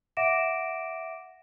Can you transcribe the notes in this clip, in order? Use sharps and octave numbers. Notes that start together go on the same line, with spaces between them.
E5 F#5 D6 A#6 D7 E7